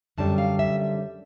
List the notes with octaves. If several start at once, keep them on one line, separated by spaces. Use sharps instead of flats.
F#2 D3 G3 A5
F5
E5